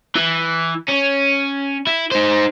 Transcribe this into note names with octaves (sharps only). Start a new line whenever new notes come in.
E3
C#4
E4
D#4 C5